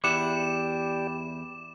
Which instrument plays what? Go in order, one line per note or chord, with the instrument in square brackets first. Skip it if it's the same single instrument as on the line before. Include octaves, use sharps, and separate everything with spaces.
[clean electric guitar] E2 E4 F#5 [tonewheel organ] G4 D5 G5 [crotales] D6 E7